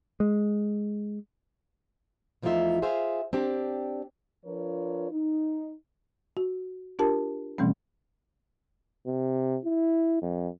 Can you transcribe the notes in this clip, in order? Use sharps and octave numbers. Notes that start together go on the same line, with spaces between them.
G#3
E2 F3 A3 D#4 F4 E5
F4 G#4 C5 E5 F5
C4 D4 G4
F3 D4 F4 A#4 B4 C#5
D#4
F#4
D4 F4 G4 A#4 A5
B2 E3 G3 A3 C4 C#4
C3
E4
F2